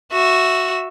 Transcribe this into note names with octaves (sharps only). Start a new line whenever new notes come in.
F#4 E5